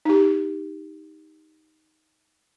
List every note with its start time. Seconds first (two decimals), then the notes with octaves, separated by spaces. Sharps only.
0.05 D#4 G4